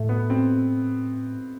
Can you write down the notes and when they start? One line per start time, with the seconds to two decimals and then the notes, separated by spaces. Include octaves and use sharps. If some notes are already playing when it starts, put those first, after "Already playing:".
Already playing: A2 A3
0.09 B3
0.30 C4